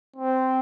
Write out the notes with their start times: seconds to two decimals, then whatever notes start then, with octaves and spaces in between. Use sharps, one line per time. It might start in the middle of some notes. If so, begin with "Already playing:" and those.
0.17 C4